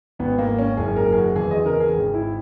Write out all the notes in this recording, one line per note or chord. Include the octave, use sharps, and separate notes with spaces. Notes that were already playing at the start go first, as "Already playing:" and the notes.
G#1 B3
A#3
G#1
C#4
F#1 G#4
A#4
F#2
G#4
F#4
E2 G#4
D#5
C#3 A#4
G#4
G#1
E4